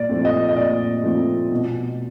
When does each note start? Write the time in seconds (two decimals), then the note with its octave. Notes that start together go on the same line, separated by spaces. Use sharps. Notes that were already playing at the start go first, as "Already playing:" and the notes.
Already playing: A#2 D5
0.09 F3 A3 C4
0.25 D#5
0.49 D#5
0.56 A#2 D5
1.04 F3 A3 C4
1.51 B2